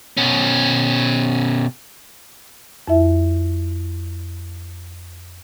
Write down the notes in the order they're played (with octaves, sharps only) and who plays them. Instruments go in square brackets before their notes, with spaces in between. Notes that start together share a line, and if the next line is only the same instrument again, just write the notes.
[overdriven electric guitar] B2 C#4
[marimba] F2 E4 E5